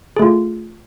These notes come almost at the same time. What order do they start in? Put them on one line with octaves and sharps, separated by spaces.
G#4 A3 F4